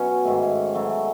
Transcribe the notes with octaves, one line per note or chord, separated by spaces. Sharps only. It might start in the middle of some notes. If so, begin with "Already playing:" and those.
Already playing: B2 F#3 C#4
G#2 D#3 A3
C#3 F#3 A3